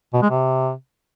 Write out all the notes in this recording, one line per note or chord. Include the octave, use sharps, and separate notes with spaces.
B2
G#3
C3